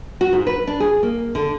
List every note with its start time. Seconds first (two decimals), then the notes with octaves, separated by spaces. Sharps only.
0.21 F#4
0.33 G#2
0.47 B4
0.67 D4
0.80 G#4
1.03 A#3
1.35 D3